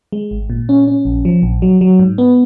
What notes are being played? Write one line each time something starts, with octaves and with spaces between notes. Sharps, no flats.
G#3
G#1
A#2
C#4
C#4
A#1
F3
A#1
F#3
F#3
G#2
B3